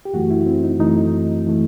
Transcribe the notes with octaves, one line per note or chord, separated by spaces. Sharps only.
G4
F#2 E3 A3 F#4
E4
C4
D#4
F#2 E3 A3 D#4
E3 A3